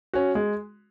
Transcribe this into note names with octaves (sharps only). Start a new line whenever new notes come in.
C#4 F#4
G#3